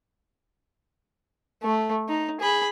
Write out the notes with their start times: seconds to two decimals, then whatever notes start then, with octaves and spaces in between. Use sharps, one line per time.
1.63 A3
2.09 D#4
2.41 G#4 B5